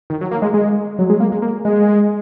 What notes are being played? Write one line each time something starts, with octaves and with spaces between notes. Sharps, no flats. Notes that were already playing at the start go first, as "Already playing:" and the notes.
D#3
F#3
A#3
G#3
G#3
F#3
G#3
A#3
G#3
A#3
G#3